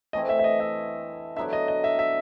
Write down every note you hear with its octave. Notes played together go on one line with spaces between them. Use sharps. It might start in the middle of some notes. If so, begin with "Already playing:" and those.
E3 A3 C4 E4 D#5
E5
E5
D#5
E5
D3 F#3 B3 E4 E5
D#5
D#5
E5
E5